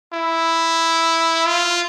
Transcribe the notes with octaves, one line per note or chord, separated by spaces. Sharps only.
E4
F4